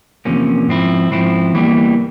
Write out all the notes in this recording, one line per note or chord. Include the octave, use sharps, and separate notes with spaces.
E2 C3 F3 A#3 C#4
G#2 F3 C4 E4
G#2 F3 C4 E4
E2 E3 G3 A#3